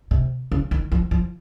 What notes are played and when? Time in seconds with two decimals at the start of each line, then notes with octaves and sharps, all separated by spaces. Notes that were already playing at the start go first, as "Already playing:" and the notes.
0.11 C3
0.52 C#3
0.71 D#3
0.92 F3
1.11 F3